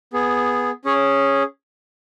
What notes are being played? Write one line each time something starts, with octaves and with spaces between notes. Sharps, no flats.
B3 G#4
C#4 G#4 C#5